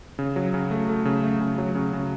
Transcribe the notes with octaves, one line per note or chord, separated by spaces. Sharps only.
C#3
F#3
C#3
A3
A3
C#3
A3
C#3
F#3
C#3
C#3